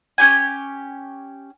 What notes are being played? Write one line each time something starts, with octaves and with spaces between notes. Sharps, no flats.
C#4 G4 G#5